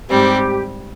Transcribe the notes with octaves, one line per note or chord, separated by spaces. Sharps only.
G#2 G3 C4 G4